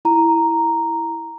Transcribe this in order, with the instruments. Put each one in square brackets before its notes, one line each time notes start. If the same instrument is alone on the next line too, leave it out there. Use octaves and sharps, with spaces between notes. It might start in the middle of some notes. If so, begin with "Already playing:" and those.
[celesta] E4 A#5